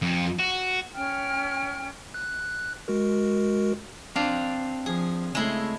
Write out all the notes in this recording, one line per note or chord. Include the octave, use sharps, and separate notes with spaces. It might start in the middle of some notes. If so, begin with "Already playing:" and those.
F2
F#4
C#4 G5 F6
F#6
G#3 F#4 A#4
C4 D4 D5 F5
F3 G#4
C#3 G#3 A3 E4 C6